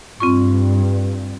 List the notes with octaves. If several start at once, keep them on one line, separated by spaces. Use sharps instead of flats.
G2 C4 F4 C#6